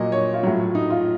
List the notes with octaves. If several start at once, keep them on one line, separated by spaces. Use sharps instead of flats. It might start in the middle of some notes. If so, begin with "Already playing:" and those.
Already playing: A#2 F#3 D#5
C#5
F4
A2 F#3
D#4
F4